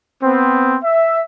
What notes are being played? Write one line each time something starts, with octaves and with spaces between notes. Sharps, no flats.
B3 C4
E5